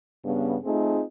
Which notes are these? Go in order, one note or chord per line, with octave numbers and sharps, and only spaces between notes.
G2 C#3 B3
A3 C4 D#4 F4 G#4